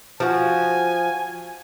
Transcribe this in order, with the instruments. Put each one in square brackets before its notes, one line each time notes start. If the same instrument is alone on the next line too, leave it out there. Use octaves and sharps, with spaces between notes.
[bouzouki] F3 F#4 [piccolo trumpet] G#5